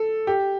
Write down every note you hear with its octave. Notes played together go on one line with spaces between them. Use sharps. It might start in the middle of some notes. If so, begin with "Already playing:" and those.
Already playing: A4
G4